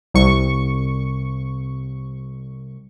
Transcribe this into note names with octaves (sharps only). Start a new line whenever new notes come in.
C2 C#6